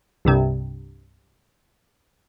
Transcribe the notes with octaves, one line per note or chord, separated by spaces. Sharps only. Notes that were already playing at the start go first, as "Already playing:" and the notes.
C2 G2 C3